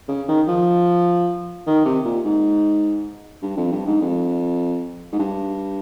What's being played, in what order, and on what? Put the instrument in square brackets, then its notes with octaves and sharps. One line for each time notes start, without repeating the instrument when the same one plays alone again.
[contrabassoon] C#3
D#3
F3
D#3
C3
A#2
G#2
G2
F2
G2
G#2
F2
G#2
G2